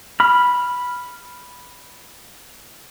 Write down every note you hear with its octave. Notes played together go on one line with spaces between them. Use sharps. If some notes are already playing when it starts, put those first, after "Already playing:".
B5 F6